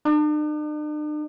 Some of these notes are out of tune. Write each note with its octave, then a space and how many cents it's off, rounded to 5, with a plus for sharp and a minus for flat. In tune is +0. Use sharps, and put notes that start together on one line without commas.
D4 +45